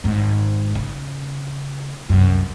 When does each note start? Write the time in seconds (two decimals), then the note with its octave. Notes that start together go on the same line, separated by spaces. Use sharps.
0.04 G#1 G#2
0.75 C#3
2.09 C2 F#2